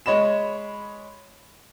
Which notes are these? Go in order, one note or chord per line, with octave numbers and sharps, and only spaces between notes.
G#3 C#5 D#5 B5 E7